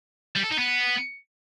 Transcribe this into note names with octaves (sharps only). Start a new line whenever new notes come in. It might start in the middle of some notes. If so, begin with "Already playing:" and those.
G3
A4
D#4
B3